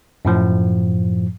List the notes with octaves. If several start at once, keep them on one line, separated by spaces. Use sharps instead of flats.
F#2 A2 F3